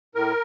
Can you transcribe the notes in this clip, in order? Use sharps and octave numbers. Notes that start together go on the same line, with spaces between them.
A2 A#4